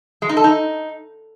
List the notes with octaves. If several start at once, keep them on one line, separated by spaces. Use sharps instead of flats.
G#3
D#4
A4
D#4